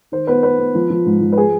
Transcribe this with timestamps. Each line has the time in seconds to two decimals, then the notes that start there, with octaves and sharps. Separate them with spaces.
0.12 D#3 C5
0.27 B3 B4
0.43 B3 B4
0.59 B3
0.75 F3
0.90 F3
1.06 G#2
1.21 F3
1.32 B4
1.38 G#4